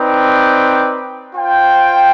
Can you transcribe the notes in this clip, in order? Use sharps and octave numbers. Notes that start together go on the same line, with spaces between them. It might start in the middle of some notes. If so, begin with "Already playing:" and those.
Already playing: C4 D#4 B4 D5 G5
F4 C5 G5